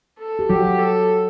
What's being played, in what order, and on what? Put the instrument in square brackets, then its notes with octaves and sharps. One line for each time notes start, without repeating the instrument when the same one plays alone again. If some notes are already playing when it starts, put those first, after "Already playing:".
[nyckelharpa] A4
[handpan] G4
[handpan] F#3 F#4 [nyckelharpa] G4
[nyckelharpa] A4